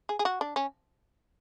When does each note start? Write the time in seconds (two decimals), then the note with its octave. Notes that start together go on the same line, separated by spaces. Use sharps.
0.09 G#4
0.19 G#4
0.25 F#4
0.41 D4
0.56 C#4